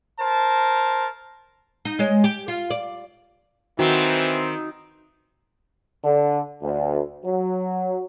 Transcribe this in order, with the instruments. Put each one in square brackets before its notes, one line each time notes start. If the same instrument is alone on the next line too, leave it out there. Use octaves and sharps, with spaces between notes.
[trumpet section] A#4 C5 A5
[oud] D#4
G#3 C#5 D#5
G4
F4
D5
[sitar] D#3 [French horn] E3 [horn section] C4 [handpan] F#4
[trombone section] D3
D2
F#3